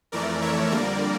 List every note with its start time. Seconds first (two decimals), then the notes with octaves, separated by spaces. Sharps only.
0.12 F2 E3 A3 A#4 D5
0.42 C#5 E5
0.71 F2 D3 G3 A#3 A#4 D5